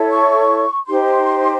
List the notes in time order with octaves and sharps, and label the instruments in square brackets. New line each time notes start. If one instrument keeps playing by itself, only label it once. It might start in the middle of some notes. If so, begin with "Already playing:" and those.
Already playing: [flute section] E4 A4 C#5
C#6
D#4 G4 C5 C6